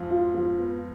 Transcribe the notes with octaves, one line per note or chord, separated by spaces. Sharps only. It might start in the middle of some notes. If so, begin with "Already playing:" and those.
Already playing: F2 G#2 F3
F4
F3
B3